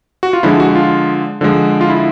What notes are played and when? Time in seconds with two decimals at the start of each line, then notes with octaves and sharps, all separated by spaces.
0.23 F#4
0.33 F4
0.43 D3 F3 G#3 E4
0.60 F#4
0.75 F4
1.41 D3 F3 G#3
1.81 F4
1.90 E4